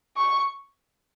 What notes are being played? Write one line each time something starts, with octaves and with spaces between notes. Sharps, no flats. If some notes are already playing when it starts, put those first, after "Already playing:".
C#6